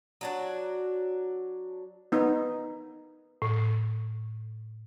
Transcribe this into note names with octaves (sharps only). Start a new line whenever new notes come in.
F#3 D4 F#4
B3 D#4
A2